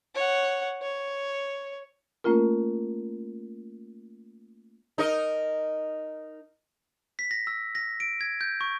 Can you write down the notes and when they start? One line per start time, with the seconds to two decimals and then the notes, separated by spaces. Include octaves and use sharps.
0.15 C#5 F#5
0.82 C#5
2.24 A3 A#3 C#4 F4 A#4
4.98 D#4 A#4 D#5
7.19 B6
7.31 A#6
7.47 E6
7.75 A#6
8.00 D7
8.21 G#6
8.41 G6
8.61 C#6